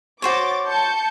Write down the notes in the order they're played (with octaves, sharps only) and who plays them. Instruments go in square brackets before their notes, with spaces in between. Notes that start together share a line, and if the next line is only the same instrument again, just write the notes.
[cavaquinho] F#4 C5 C#5 [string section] D6 A6
[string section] A5 G6 C#7